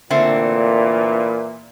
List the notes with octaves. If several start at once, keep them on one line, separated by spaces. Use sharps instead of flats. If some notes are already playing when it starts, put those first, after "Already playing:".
A#2 D3 E3 A3 C4